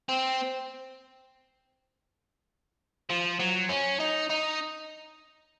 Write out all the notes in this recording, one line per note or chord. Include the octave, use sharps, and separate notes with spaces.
C4
F3
F#3
C#4
D#4
D#4